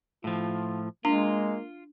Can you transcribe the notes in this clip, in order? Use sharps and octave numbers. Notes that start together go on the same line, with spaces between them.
A2 F3 F4
G#3 A#3 D4 F4